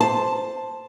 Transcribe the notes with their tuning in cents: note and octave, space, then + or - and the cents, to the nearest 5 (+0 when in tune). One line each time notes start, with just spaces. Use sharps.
C5 +0 A5 +0